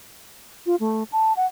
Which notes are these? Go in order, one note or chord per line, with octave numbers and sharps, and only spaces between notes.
F4
A3
A5
F#5